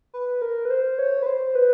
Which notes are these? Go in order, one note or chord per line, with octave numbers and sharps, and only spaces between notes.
B4
A#4
B4
C5
C#5
B4
C5
B4